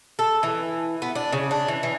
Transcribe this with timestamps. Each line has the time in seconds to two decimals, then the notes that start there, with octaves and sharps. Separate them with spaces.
0.19 A4
0.43 E3
1.02 B3
1.15 D4
1.32 C#3
1.51 D4
1.68 E3
1.83 E3